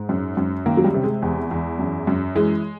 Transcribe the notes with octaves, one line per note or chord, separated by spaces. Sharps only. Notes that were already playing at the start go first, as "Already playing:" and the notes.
Already playing: G#2
F#2
F#2
D#3 A#3
F#3
G3
C3
G#3
E2
E2
F#2
F#2
E3 G#3